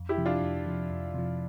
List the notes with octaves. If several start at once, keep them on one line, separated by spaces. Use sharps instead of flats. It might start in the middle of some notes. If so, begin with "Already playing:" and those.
Already playing: F2
E4 G4
C3 F3
D4 F4
F2
C3 F3
F2
C3 F3